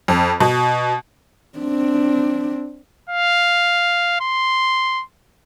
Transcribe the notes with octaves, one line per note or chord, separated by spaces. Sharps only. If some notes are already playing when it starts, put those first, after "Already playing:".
F2
B2
C4 D4
F5
C6